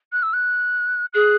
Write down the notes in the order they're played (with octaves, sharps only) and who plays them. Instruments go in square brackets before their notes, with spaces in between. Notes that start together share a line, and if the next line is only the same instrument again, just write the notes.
[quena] F#6
E6
F#6
[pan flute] G#4 [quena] F#6